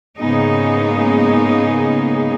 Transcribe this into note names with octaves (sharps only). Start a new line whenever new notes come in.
G#2 C#3 A#3 B3 D#4 G#4